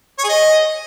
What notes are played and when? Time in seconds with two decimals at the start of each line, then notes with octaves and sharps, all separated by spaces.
0.19 C#5
0.24 G#4
0.29 D#5